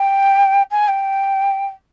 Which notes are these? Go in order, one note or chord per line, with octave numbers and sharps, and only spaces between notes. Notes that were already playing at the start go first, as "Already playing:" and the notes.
Already playing: G5
G#5
G5